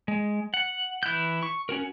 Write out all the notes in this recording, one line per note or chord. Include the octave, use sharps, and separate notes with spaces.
G#3
F#5
E3 E4 F#6 G6
C#6
C#4 F#4 A#4